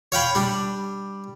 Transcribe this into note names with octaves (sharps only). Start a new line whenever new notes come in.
C#5 F5 G5 B5
G3 D4